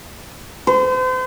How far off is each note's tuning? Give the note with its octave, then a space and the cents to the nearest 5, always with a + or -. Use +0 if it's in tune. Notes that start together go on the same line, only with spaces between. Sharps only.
C5 -40